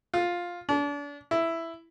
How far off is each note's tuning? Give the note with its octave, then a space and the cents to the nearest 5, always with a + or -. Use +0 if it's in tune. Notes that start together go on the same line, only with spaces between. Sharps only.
F4 +5
D4 -35
E4 +5